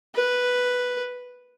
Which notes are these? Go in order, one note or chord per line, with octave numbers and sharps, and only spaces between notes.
B4